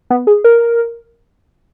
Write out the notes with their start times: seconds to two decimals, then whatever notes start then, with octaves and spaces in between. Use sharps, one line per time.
0.10 B3
0.27 G#4
0.44 A#4